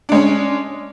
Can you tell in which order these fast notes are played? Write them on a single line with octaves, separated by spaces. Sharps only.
D4 G#3 C#4